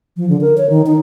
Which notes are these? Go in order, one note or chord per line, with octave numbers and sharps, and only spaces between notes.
F3
D3
A#4
C#5
D#3
D#4